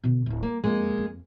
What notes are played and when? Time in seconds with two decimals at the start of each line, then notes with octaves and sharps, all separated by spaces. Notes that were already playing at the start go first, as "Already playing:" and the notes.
0.04 B2 D3
0.26 D1 E4
0.43 G3 A#3
0.64 F2 G#3 A#3
0.98 F2